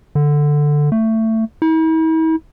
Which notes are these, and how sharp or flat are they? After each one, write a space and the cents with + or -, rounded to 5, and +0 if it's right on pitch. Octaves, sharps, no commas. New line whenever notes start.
D3 +5
A3 +20
E4 -45